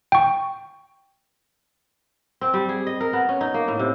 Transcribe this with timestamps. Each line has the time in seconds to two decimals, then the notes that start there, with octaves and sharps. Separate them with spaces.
0.12 G5 C#6
2.41 C4
2.54 G3
2.69 G#4
2.87 D#5
3.01 A#4
3.13 B3
3.29 C#4
3.41 D#4
3.54 A#3
3.68 A2
3.79 C3